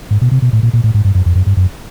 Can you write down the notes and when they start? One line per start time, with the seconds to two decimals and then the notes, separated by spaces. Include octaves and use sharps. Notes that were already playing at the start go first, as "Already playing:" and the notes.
0.11 G#2
0.21 B2
0.31 C3
0.42 B2
0.53 A2
0.63 A#2
0.73 A#2
0.84 A2
0.94 G#2
1.05 G2
1.15 F#2
1.26 F2
1.35 F#2
1.46 G2
1.57 F#2